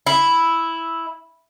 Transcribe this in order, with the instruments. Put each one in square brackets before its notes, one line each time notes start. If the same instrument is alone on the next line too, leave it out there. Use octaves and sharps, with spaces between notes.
[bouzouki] E4